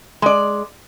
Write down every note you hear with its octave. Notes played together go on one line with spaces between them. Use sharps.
G#3 D5